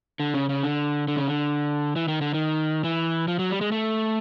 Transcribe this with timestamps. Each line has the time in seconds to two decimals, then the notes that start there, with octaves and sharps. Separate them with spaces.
0.20 D3
0.34 C#3
0.49 C#3
0.63 D3
1.08 D3
1.17 C#3
1.27 D3
1.96 E3
2.08 D#3
2.21 D3
2.34 D#3
2.84 E3
3.28 F3
3.39 F#3
3.50 G3
3.61 G#3
3.72 A3